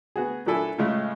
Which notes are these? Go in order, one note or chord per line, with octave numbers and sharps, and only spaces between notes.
B3 F#4 G#4
A#2 F#3 D4 E4 A4 G#5
A2 C#3 G#3 A3 F4